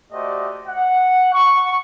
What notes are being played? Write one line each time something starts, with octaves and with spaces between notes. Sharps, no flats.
A3 F#4 G4 C5 D5 D#5
F#5
C#6